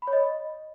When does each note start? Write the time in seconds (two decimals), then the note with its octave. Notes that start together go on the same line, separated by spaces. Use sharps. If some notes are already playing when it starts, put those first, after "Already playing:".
0.02 B5
0.07 C#5
0.13 D#5